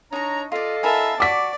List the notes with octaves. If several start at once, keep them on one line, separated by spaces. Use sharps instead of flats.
D4 D#4 C#5 A#5 C#6
F4 A4 D5 D#5 F5
E4 A#4 E5 G#5 A5
F#4 D5 C#6 D6 B6